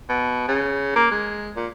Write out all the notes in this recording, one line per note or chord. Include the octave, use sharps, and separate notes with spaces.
B2
C#3
A#3
G#3
A#2